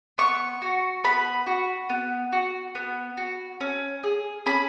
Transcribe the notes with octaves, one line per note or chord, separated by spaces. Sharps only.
B3 C#6
F#4
B3 B5
F#4
B3
F#4
B3
F#4
C#4
G#4
C#4 B5